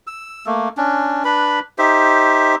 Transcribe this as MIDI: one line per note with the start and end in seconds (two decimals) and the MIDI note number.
0.07 0.45 88
0.46 0.69 57
0.46 0.69 58
0.77 1.23 61
0.77 1.23 62
1.25 1.60 62
1.25 1.60 71
1.25 1.60 83
1.78 2.55 63
1.78 2.55 67
1.78 2.55 72
1.78 2.55 76